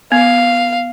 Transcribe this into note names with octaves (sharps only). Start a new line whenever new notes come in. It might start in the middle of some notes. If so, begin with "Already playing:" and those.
B3 F5